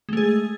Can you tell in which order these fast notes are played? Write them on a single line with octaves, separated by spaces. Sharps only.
G#3 A3 G#4